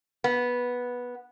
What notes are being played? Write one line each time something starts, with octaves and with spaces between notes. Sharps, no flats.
B3